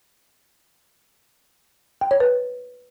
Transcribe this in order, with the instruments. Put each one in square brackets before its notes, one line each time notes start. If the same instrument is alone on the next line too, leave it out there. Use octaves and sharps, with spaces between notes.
[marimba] G5
C#5
B4